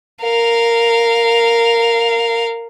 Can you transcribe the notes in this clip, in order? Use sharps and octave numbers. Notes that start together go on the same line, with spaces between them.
A#4 F5